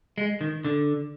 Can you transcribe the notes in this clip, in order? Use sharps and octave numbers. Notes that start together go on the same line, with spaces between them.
G#3
D#3
D3